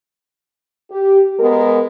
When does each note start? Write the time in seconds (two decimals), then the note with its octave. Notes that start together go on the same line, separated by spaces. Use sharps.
0.92 G4
1.40 G#3 B3 A#4